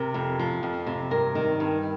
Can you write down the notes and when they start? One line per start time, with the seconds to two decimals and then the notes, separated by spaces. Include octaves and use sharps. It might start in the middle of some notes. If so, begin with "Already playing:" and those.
Already playing: C3 A#4
0.14 F2
0.39 F3
0.63 F2
0.87 C3
1.11 G2 A#4
1.35 D#3
1.60 G2